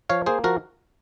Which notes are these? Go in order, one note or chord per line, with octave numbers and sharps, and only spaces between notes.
F3 C#5 F5
A#3 G#4 C5
F3 F#4 A#4